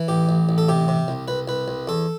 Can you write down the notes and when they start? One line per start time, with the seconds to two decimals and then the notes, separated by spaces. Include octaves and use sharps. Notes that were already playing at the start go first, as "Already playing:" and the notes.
Already playing: E3
0.08 A1 G4
0.29 A1
0.49 A1
0.58 A4
0.69 C3 G4
0.88 C3
1.08 C2
1.28 C2 B4
1.48 C2 B4
1.68 C2
1.88 E2 A4